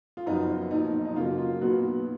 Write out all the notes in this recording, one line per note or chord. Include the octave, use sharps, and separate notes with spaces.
F4
F#1 F#2 F3 B3 D#4
B1 A#2 F3 D#4
D#4
F#2 C#3 F#3 A#3 F4
F4
B1 A#2 F#3 B3 F#4